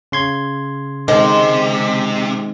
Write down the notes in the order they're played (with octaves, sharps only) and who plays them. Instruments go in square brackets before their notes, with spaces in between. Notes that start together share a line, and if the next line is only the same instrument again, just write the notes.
[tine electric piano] C#3 C6 G#6
[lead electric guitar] C3 [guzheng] D#3 C4 [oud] G#3